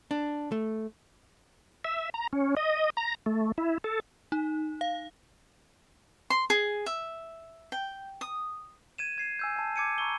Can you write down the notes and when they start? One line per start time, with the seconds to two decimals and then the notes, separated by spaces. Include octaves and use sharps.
0.11 D4
0.52 A3
1.85 E5
2.14 A#5
2.33 C#4
2.57 D#5
2.97 A#5
3.26 A3
3.58 E4
3.84 A4
4.32 D#4
4.81 F5
6.30 C6
6.50 G#4
6.86 E5
7.72 G5
8.21 D#6
8.98 G#6 D#7 E7
9.18 G#6 C7 E7
9.39 G#5 E6 G6
9.56 G#5 A5
9.76 D6 G#6 C#7 D#7
9.98 A#5 C#6 E6 G7